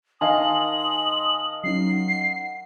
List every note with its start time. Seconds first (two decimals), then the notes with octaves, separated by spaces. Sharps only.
0.21 D#3 D#5 F5 G#5 A5 C6 D#6 F#7
1.64 F#3 C#4 D#4 C7
1.91 F#5